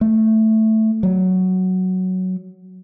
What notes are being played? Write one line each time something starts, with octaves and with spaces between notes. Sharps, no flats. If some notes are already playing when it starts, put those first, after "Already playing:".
A3
F#3